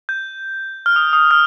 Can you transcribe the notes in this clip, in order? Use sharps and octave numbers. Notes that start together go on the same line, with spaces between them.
G6
F6
D#6
D#6
F6